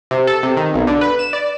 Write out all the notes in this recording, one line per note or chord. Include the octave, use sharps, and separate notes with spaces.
C3
A4
C3
D#3
B1
D3
B4
E7
D5